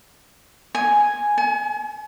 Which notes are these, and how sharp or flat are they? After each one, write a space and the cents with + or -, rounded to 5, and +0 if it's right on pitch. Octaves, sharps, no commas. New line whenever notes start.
G#5 +0
G#5 +40